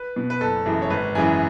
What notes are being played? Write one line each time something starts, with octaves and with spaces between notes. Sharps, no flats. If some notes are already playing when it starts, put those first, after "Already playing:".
Already playing: B4
B2
B4
F#1 A4
F#2 C#3 E3
C#5
G#1 B4
F#2 C#3 E3 G#5